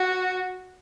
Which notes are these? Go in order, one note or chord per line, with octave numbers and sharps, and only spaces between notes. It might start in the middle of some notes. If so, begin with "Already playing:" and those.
Already playing: F#4